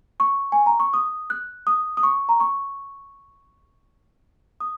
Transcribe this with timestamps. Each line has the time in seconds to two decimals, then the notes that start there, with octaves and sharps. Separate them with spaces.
0.20 C#6
0.52 G#5
0.66 A#5
0.80 C#6
0.93 D#6
1.30 F#6
1.67 D#6
1.97 D#6
2.03 C#6
2.29 A#5
2.40 C#6
4.60 D#6